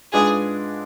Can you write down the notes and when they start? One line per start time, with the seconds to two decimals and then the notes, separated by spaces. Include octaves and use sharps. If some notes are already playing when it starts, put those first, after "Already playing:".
0.13 G#2 G#3 D4 F4 G#4 B4